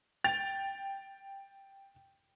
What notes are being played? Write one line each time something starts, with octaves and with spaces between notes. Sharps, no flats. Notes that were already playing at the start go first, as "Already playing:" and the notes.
G5 A6 F7